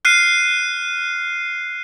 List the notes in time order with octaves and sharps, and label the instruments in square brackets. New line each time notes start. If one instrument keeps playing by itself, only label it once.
[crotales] F6 F#6 C7 D#7